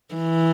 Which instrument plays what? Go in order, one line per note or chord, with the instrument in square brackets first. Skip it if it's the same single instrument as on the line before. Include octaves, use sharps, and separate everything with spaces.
[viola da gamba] E3